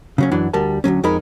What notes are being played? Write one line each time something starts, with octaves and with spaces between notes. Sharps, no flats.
C#3 F#3 C#4
F#2 E3 F#3 D4
D2 G3 A#4 A5
D2 B2 F#3 C#4
F2 G#3 D#4 A#4 B5